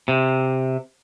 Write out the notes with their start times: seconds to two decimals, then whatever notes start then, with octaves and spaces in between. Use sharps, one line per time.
0.08 C3